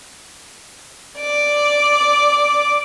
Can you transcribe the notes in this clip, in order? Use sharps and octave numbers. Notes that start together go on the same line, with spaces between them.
D5 D6